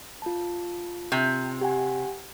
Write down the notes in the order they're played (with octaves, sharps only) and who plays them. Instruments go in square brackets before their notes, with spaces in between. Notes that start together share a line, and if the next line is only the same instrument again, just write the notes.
[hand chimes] F4 A5
[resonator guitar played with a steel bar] C3
[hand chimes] G4 F#5 G#5